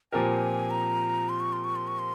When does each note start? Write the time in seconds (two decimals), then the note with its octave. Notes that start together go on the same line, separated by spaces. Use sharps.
0.13 A#2 F3 C4 G4 A#4 G#5
0.71 A#5
1.29 C6
1.40 C#6
1.53 C6
1.64 C#6
1.76 C6
1.87 C#6
1.99 C6